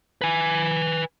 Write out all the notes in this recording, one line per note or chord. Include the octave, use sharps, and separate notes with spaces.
B4 G#5